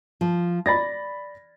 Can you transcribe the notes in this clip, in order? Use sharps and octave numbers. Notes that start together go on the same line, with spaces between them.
F3
D5 B5 A6 A#6